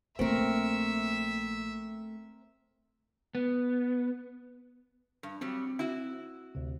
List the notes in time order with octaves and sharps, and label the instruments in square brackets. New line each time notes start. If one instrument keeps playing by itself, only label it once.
[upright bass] A#1 A#3 [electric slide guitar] A3 [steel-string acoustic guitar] C4 A#4 [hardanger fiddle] E5
[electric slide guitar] B3
[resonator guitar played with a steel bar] G2
[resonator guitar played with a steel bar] F#3 G3 [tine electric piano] C4
[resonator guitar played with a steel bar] E4 F#4
[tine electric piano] D2 C3